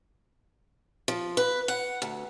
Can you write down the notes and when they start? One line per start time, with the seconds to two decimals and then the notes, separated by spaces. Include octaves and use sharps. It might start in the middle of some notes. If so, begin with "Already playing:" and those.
1.08 F3
1.37 B4
1.68 F#5
2.02 D2